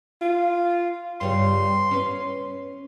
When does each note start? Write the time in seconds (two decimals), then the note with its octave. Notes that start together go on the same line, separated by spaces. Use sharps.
0.21 F4
1.21 G2 C#3 G3 C6
1.91 C#4 B4